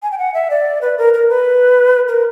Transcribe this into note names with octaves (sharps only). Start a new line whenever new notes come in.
G#5
G5
F#5
E5
D5
B4
A#4
A#4
B4
A#4